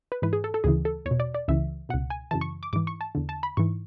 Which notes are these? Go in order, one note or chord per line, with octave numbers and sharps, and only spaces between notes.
B4
G#2 E3 B4
G#4
A4
A4
D2 C#3 E3 G#4
A4
E2 C#5
B2
D5
D5
C#2 C#3 E3 E5
C#2 B2 F#5
G#5
F#2 C#3 E3 A5
C#6
D6
G#2 E3 D6
C#6
A5
E2 D3
A5
B5
G#2 E3 C#6